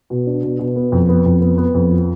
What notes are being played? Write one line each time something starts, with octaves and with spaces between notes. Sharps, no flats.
B2
D4
B2
B2
B3
F2
B3
F2
B3
B3
F2
F3